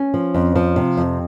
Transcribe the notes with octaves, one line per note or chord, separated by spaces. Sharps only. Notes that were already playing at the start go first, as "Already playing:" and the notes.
Already playing: C#4
F3
F2
F3
C3
F2